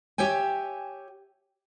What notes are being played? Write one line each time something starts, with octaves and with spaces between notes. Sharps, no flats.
G4 C#5 E5 G5 G#5